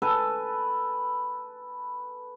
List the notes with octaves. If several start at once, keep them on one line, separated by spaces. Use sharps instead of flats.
A4 B4 G#5 A5